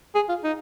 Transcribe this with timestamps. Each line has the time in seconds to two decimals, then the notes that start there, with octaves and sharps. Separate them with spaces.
0.15 G#4
0.29 F4
0.44 D#4